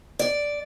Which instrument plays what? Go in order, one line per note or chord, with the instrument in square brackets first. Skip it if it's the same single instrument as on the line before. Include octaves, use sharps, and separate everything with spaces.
[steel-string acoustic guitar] D5